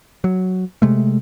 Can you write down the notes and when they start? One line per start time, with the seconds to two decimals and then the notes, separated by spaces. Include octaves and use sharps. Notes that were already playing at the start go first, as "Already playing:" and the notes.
0.24 F#3
0.82 C3 G#3 A3